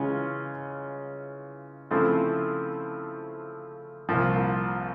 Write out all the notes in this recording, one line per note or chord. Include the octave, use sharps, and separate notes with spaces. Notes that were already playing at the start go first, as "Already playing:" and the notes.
Already playing: C#3 E3 G#3 C#4 F4
C#3 F3 A3 C4 E4
C2 A#2 F3